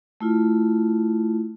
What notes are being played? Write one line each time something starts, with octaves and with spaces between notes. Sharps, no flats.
A3 E4 F4